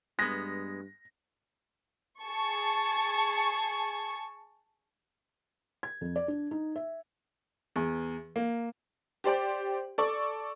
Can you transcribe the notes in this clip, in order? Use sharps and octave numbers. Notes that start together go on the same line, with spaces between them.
G2 G#3 B3 A#6
G#4 A5 C#6
G#6
F2
D5
D4
D#4
E5
E2
A#3
G4 C5 D5 G5
A4 D5 C#6